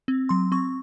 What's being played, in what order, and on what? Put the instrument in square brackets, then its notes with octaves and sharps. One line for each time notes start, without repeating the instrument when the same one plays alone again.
[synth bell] C4
F#3 C6
C4 C#6